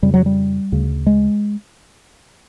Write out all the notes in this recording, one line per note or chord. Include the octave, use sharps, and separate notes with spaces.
F2 C#3 G3
F#3
G3
D2 C#3
G#3